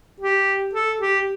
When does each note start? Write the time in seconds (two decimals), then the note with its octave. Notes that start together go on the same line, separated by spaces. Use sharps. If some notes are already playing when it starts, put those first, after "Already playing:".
0.20 G4
0.74 A4
1.01 G4